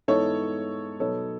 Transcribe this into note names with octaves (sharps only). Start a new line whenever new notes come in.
G#2 E3 B3 D#4 A4 C#5
B2 F#3 B3 D#4 A4 C#5